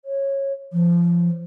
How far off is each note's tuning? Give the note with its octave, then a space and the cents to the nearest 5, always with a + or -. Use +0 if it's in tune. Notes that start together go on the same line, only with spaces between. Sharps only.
C#5 -15
F3 -20